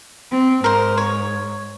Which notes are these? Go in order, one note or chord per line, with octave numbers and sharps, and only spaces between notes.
C4
G#2 A#4 C5
C#5